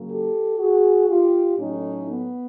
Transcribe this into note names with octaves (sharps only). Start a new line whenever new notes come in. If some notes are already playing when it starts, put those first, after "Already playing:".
Already playing: C#3 F#3 A#3
G4 A4
F#4 G#4
F4 G4
A2 F#3 A3 C#4 D#4
B3